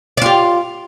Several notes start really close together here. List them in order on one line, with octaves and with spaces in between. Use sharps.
D5 F4 G4